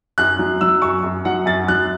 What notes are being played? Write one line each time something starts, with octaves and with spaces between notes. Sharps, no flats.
F#2 F#6
F#3
F#3 E6
F#2 C#6
F#2
F#3 F#5
F#2 A6
F#3 F#6